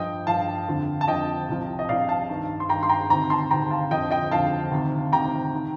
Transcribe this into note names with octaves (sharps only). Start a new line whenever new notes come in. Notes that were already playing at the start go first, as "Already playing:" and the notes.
Already playing: G2 F3 D#5 G5
G2 F3 F5 A5
F2 D3 F3
A5
F2 D3 F3 D#5 G5
C2 C3 F3
D#5
C2 C3 F3 D5 F5
F5 A5
G2 D#3
C6
G2 D#3 G5 A#5
C6
G5 A#5
D2 C3 D#3 G5 A#5
A5 C6
D2 C3 D#3 G5 A#5
F5 A5
F2 D3 F3 D#5 G5
D#5 G5
F2 D3 F3 F5 A5
D2 C3 D#3
D2 C3 D#3 G5 A#5
D#3